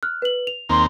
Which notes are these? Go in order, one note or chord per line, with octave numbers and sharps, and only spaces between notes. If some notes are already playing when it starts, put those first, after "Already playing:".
F6 F#6
B4 F#7
F7
D#2 A#3 C4 C6